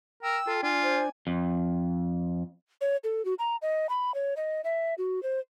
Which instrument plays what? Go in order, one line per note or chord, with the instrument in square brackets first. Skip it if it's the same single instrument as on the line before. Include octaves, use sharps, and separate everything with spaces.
[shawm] A#4 [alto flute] G5 [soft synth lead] E6
[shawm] F4 [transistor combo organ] A4
[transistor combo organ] D4 [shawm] F4 [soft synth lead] G#5
[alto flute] C5
[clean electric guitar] F2
[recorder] C#5
A4
F#4
A#5
D#5
B5
C#5
D#5
E5
F#4
C5